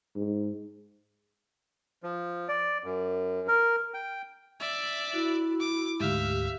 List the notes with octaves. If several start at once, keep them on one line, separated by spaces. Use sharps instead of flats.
G#2
F3
D5
F#2
A#4
G5
D5 E5
E4 F#4 E6
D6
D2 G#2 G4 E5 F5